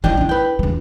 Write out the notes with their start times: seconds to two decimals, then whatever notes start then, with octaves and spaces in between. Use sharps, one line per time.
0.04 F3 D4 E4 D#5 G5
0.17 D#4 E4
0.29 B4 G5
0.59 E1 F4